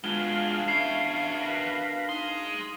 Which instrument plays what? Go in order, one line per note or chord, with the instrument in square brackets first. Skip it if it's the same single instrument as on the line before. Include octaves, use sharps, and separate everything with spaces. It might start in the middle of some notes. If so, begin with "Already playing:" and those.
[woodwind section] B2 D4 F5 [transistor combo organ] G#3 F4 [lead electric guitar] B3 G#4 [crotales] G7
[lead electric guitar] B3 E5 [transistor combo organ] C#4 [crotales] C7
[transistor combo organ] A#4 B4
[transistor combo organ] D#4 [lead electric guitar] G#4 C6